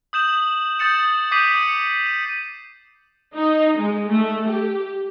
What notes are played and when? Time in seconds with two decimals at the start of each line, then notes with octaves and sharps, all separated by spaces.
0.13 D#6 G6 E7 F#7
0.79 D#6 G6 A6 C#7 E7
1.31 D6 D#6 G6 B6 C7 D#7
1.63 C#7
2.06 D#7
3.35 D#4
3.78 G#3
4.09 A3
4.48 G4